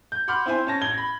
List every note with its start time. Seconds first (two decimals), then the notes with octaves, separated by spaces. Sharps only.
0.12 G6
0.28 F#5 B5 C6 D6 F6 G6
0.46 C4 E4 C5 G#5
0.67 C#4 A5 A#6
0.81 A1 G#6 G7
0.98 B5